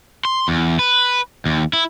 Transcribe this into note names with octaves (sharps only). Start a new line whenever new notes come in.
C6
E2
B4
D#2
E4